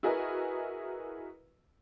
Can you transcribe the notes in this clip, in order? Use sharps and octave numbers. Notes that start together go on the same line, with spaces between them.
E4 F#4 G#4 A#4 B4 D#5